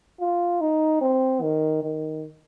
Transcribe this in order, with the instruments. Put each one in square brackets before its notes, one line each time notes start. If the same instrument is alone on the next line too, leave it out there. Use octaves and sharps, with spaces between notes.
[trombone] F4
D#4
C4
D#3
D#3